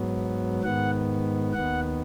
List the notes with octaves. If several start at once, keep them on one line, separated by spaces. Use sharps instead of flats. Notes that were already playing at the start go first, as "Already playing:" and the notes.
Already playing: G#2 F#3 B3
G#2 D#3 B3 F#5
D#2 D#3 B3 F#5